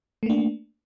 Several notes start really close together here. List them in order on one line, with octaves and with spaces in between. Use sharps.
A3 A#3 D4